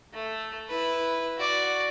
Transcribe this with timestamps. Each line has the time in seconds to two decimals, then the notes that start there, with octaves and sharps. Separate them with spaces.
0.13 A3
0.69 E4 B4
1.38 F#4 D5